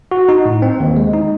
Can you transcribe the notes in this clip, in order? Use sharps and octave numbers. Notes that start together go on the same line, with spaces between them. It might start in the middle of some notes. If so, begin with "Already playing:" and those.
F#4
D#4
A2
C4
D#2
G#3
D#4